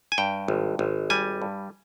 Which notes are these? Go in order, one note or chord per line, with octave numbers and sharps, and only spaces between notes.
G#5
G2 G5
G#1
G#1
G3 G#5
G2